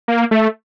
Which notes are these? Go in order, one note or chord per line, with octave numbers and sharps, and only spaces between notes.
A#3
A3